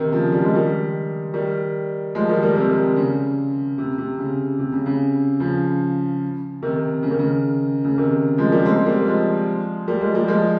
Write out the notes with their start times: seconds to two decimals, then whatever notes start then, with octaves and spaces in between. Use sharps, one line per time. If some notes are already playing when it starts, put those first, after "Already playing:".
Already playing: C3 D#3
0.12 C#3 F3
0.32 G3
0.44 G#3
0.55 D#3 G3
1.34 D#3 G3
2.15 F3 G#3
2.29 D#3 G3
2.42 G3 A#3
2.55 C3 D#3
2.96 C#3
3.78 C3
3.98 C3
4.19 C#3
4.59 C3
4.72 C#3
4.86 C#3
5.40 C#3 F3
6.62 C3 D#3
7.03 C#3
7.11 D#3
7.19 C#3
7.85 C#3
7.98 C3 D#3
8.38 F3 G#3
8.52 G3 A#3
8.65 G#3 C4
8.86 G3 A#3
9.06 F3 G#3
9.88 G3 A#3
10.01 F3 G#3
10.14 G3 A#3
10.28 F3 G#3